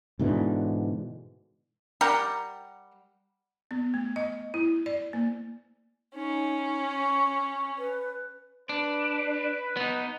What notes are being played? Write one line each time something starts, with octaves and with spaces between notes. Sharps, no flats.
G#2 B2 D3 E3
G3 G4 A#4 F#5
B3
A3
D#5
E4
D5
A#3
C#4 D#4
C#6
B4
D4 B4
B3 D#4